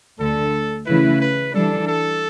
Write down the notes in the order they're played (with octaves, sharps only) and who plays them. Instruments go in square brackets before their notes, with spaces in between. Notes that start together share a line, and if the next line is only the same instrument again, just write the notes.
[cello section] D2 D3 A3 [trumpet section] A4
[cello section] C#3 E3 A3 E4 [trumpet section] B4
[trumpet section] B4
[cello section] E3 G3 D4 [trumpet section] A4
[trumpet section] A4